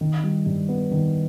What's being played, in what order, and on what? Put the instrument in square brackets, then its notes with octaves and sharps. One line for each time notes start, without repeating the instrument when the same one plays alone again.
[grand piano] D#3
G3
G2
B3
D#3